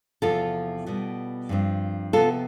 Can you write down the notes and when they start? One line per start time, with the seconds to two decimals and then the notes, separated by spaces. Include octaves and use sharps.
0.22 E2 C3 F3 F4 A4
0.86 B2 G3 B3
1.49 G2 F3 C4
2.13 C3 F3 B3 F4 A4